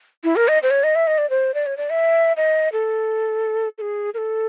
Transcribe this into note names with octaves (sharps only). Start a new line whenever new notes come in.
E4
A#4
D#5
C5
C#5
D#5
E5
D#5
D5
C5
D5
C#5
D5
E5
D#5
A4
A4
G#4
A#4
A4